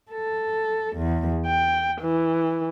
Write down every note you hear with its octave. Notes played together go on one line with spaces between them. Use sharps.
A4
E2
G5
E3